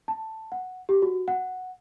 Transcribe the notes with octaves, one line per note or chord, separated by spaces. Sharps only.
A5
F#5
G4
F#4
F#5